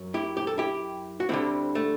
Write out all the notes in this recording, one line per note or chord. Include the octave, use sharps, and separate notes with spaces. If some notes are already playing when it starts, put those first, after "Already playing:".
Already playing: F#2 F#3
E4 G4
G4
A4
E4 G4
F#4
D2 D3 G3 C4 E4
A3